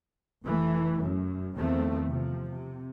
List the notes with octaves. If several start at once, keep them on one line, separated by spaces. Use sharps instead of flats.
F1 E3 A3
F#2
E2 D#3 F3 A3 C4
C3 F3
C3